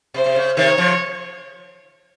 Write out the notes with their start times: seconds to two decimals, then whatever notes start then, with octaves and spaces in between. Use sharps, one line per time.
0.14 C3 C5
0.26 C3
0.36 C#3
0.57 C3 D#3 C#5
0.78 C#3 F3